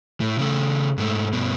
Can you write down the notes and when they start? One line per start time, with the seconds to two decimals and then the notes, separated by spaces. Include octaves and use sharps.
0.20 A2
0.39 C#3 A3
0.98 G#2 A3
1.33 G2 B2